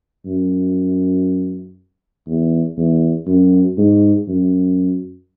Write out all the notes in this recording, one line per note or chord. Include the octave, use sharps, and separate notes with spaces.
F#2
E2
E2
F#2
G#2
F#2